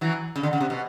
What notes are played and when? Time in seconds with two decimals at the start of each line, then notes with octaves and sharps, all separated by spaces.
0.01 E3 F#3
0.36 C#3
0.43 D3
0.53 C#3
0.60 C3
0.70 B2